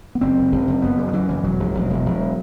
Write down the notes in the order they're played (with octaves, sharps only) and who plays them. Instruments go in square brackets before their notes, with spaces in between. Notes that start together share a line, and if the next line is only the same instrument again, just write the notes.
[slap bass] B3
F#1 C4
F#1
F#1
F#1
F#1 B3
F#2
D#3
F#2 E3
F#1 E3
E1 F#3
E1
E1
E1
E1